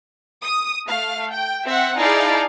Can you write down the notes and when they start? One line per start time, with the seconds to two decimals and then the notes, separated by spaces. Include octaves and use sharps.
0.42 D#6
0.86 A3 F5
1.31 G5
1.65 C4 E5 F#5
1.96 D#4 E4 G#4 D5 F5 A5